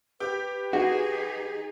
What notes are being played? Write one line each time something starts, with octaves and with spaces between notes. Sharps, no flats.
G4 B4
D#4 F#4 G#4